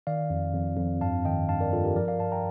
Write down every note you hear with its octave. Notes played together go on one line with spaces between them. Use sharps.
D#3 D5 F5
F2
F2
F2
G2 F5 A5
D#3 D#5 G5
G2 F5 A5
A#4 D5
G2 F4 A4
G4 A#4
F3 A#4 D5
D5 F5
G2 F5 A5
G5 A#5